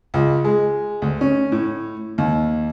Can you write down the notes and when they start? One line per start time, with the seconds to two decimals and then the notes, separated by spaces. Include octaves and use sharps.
0.14 C#2
0.45 G#3
1.02 D2
1.21 C#4
1.52 A2
2.18 D#2